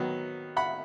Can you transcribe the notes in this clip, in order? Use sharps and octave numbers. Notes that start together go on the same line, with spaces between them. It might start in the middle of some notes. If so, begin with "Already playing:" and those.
Already playing: D#3 F#3 B3
F#5 B5